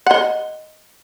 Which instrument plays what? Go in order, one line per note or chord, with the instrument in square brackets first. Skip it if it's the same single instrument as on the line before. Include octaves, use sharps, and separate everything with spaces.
[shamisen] D#5 F#5